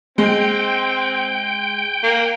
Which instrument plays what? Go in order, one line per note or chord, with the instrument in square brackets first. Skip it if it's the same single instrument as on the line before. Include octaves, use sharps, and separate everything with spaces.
[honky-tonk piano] G#3 [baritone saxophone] C4 [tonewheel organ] G5
[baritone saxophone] A#3